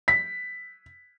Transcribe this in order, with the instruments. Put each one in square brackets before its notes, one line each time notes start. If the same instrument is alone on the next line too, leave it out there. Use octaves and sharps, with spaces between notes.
[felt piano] B6